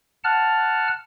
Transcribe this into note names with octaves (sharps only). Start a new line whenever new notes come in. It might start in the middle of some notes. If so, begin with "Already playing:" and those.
F#5 A5 F6